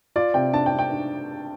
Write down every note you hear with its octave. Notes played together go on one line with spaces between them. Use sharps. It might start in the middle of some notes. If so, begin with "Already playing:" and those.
F4 D5
C3 G5
D4 A5
G5
D4
G5
D4